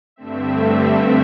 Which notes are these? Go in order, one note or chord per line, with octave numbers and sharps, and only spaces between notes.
G2 D3 A3 C4 E5